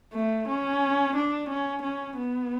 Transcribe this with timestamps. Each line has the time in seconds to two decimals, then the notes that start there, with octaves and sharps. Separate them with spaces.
0.13 A3
0.48 C#4
1.16 D4
1.49 C#4
1.82 C#4
2.16 B3